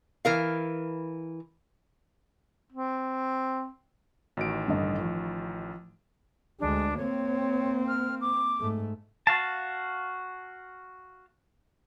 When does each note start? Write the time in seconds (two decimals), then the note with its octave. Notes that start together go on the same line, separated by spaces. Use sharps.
0.25 E3 A#4 F5
2.72 C4
4.37 A1 D#3 F#4 D7
4.68 G2 D3 D#5
4.98 F3
6.60 D2 G#3 D4
6.97 A#3 C4 C#5
7.88 F6
8.21 D6
8.60 G#2 A3
9.27 F#4 F5 A5